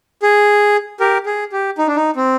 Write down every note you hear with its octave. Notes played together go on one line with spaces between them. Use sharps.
G#4
G4 A#4
G#4
G4
D#4
D4
D#4
C4